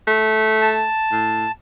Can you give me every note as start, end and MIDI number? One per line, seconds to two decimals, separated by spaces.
0.07 0.87 57
0.61 1.52 81
1.12 1.46 45